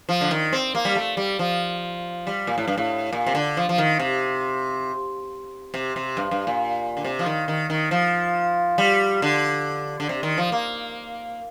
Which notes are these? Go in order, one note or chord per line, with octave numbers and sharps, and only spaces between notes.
F3
D3
D#3
C4
A#3
G3
A3
G3
F3
G3
A#2
A2
G2
A2
A#2
C3
D3
F3
F3
D#3
C3
C3
C3
G2
G2
A#2
D3
C3
F3
D#3
D#3
D#3
F3
G3
D3
D3
C3
D#3
F3
A#3